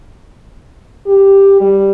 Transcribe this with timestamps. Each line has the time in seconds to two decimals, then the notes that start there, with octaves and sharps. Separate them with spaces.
1.07 G4
1.61 G3